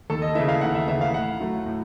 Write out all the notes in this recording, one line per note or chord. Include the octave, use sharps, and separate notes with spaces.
D#2 A4
D#5
C#3 E3 E5
F5
D#2 F#5
E5
C#3 E3 E5
F5
A2 F#5
F#3 A3
A2